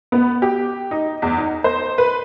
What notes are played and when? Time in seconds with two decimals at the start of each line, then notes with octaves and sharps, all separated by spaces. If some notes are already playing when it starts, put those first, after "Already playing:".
0.12 B3
0.42 G4
0.91 D#4
1.22 E2
1.38 D#4
1.64 C5
1.98 B4